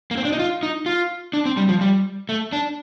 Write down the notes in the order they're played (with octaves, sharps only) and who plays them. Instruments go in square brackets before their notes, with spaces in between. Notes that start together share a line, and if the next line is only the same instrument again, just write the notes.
[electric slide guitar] A#3
C4
D4
D#4
F4
D#4
F4
D4
C4
G3
F3
G3
A3
D4